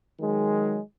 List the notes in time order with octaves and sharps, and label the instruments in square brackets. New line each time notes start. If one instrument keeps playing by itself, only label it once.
[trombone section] D#3 F#3 G#3